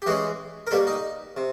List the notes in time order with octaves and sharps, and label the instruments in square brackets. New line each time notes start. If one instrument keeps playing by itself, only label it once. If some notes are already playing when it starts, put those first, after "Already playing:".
[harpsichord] G4
E3 G#3 C#4 F#4 G#4
A#4
B2 G3 A#3 G4 A4
D#4
C3